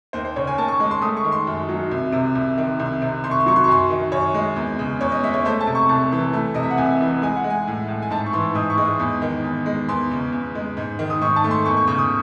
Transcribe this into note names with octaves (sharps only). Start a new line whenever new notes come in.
D#2 C5
C5
C#3 C#5
G#5
D#2 A5
C#6
G#3
C6
A3 D#6
C#6
D#3
C6
F#2
F#3
C2
C3
C2
D#3
C2
C3
C2 C6
C#6
C6
F#3 C#6
C6
C#6
F#2 C6
D#3
F#2 C#5
G#3
E2
C#3
E2 C#5
D#5
G#3 E5
C#5
A3 C5
A5
C3
C#6
C2 A5
E3
A3
C3 D#5
E5
F#5
C2 G#5
E3
G#3 G#5
F#5
G#3
G#5
A2
A2
G#5
G#2 A5
C#6
E3 C6
G#2 D#6
C#6
G#3
D#6
E2
D#3
E2
G#3
E2 C6
C#3
E2
G#3
G#2
D#3
D#6
G#2 C#6
A5
A3
C6
E2 C#6
C#6
C#3 C#6
D#6